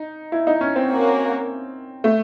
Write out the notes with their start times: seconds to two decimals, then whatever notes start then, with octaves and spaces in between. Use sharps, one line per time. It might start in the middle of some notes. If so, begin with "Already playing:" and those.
Already playing: D#4
0.32 E4
0.47 D#4
0.61 C#4
0.76 C4
0.89 A#3 C#4 F#4
2.04 A3